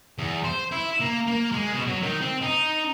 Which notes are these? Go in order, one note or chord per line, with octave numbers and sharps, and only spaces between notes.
E2
C5
E4
A#3
A#3
G#3
B2
F#3
D#3
C4
D#4